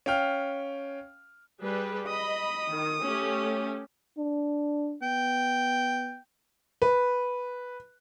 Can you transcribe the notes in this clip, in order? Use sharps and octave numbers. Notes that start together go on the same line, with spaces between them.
C#4 F5 G5 F6
G3 G#4 B4
D#5 B5 D#6
D#3
A3 C#4 G4
D4
B3 G5
B4